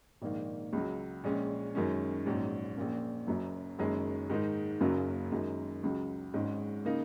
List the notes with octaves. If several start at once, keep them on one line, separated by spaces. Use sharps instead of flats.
A#1 G#2 D#3 A#3
C#2 C#3 F#3
A#1 A#2 G#3 C#4
F#2 D#3 G#3 C#4
A#1 G#2 F#3 C#4
A#1 A#2 A#3 C#4
F#1 F#2 F#3
F#1 F#2 D#3 G#3 C#4
G#2 D#3 G#3 D#4
F#1 F#2 C#3 F#3 A#3
F#2 D#3 G#3
C#2 C#3 F#3
G#1 G#2 G#3 C#4
C#3 A#3 D#4